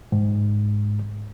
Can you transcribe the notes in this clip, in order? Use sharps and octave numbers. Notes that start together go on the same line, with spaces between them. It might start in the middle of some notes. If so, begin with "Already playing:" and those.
G#2